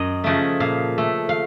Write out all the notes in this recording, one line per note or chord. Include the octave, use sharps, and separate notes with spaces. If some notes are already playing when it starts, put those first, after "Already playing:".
Already playing: F#2 D#5
C#3 F3 A3
A#2 F5
A3
F5